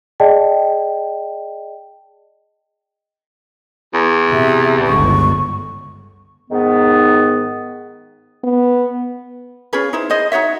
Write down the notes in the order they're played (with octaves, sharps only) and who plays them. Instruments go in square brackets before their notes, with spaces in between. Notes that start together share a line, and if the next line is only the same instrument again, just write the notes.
[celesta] G#4 D5 D#5 G5 A5
[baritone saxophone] E2
[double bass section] C3 [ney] E5
[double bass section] G1 C#2 D3 [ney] C#6
[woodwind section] G#2 D#3 B3
[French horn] B3
[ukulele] C#4 F4 G#4 B4
D#4 E4 C5
G#4 C5 D#5
D#4 F#4 C#5 E5